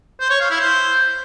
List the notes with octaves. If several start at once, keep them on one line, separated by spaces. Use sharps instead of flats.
C5
C#5
F5
E4
C5